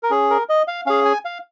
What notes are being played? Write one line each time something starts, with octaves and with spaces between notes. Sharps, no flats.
A#4
C#4 G#4
A#4
D#5
F5
C#4 G#4 F5
G#5
F5